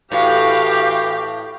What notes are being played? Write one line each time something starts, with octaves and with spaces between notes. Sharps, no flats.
A2 E3 F#4 G4 F5